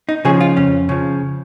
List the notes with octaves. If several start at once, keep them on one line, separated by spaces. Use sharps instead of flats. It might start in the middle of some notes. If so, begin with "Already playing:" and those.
D#4
C#3 F3 G#4
F4
F2 C#4
C#3 F3